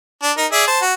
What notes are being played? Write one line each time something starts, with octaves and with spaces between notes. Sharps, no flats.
D4
D#4 A#4
G#4 D5 E5
C5 A5
F#4